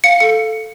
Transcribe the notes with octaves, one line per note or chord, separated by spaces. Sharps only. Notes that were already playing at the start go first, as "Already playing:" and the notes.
F5 C#7
A4 C#7